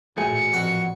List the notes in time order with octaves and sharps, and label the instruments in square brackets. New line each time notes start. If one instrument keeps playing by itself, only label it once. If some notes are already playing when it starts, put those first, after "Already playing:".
[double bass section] A1 A#2 [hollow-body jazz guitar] A3 F#4 G#4 [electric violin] C#7
[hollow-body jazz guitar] F2 [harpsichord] F#4